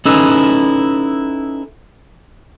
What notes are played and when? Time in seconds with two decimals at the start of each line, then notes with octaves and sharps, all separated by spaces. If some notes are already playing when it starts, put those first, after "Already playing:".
0.05 C#4 D#4 E4 A4 B4 D#5